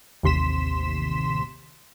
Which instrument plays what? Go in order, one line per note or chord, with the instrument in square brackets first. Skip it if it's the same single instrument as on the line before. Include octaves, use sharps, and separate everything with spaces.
[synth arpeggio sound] A1 D#2 C3 C6 B6 E7